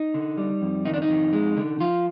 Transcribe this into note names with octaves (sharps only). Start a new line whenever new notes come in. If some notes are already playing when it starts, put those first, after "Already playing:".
Already playing: D#4
D3
G3
F2
D#3 D#4
D4
D#4
F2
G#3
D3
F3 F4